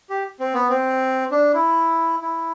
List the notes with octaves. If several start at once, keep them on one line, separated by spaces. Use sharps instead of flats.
G4
C4
B3
C4
D4
E4
E4